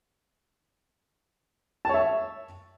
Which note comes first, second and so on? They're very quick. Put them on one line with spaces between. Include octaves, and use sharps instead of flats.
A5 C#5 E5